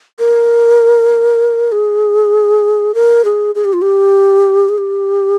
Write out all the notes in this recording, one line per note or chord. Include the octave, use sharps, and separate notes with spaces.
A#4
G#4
A#4
G#4
G#4
G4
F4
G4
G#4
G4